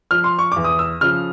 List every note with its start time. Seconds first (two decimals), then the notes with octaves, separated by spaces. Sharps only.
0.11 F3 F6
0.24 C6
0.39 C#6
0.52 E2 D6
0.64 D#6
0.79 E6
1.01 C#3 F3 F6